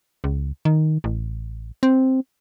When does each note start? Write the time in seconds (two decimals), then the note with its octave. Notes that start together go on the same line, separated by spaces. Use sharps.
0.24 C#2
0.65 D#3
1.04 A1
1.83 C4